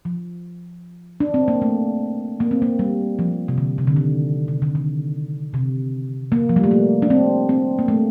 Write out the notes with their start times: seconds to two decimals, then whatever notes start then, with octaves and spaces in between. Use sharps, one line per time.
0.05 F3
1.20 D4
1.34 C4
1.48 A#3
1.62 A3
2.40 A#3
2.51 C4
2.62 A#3
2.79 G3
3.19 F3
3.48 C3
3.58 D3
3.78 C3
3.87 D3
3.96 D#3
4.48 C3
4.62 D3
4.75 D#3
5.54 C3
6.32 A#3
6.49 F3
6.56 G3
6.64 A3
6.71 A#3
7.02 D4
7.10 C4
7.49 C4
7.79 A#3
7.88 A3